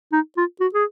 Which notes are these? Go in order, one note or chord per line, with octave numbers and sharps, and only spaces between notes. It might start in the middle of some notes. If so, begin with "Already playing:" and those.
D#4
F4
F#4
G#4